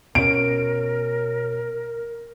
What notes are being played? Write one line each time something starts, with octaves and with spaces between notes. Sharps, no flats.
B2 C#4 A#4 D7